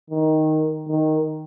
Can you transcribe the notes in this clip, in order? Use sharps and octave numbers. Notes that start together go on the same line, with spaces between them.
D#3
D#3